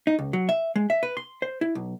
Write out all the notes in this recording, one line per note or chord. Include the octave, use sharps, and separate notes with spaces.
D#4
C#2
F#3
E5
G#3
E5
B4
C6
C5
E4
B1